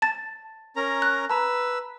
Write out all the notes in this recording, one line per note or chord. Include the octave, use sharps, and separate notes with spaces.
A5 A6
C#4 A#4 A#5
F#6
B4 A5 A#5 E6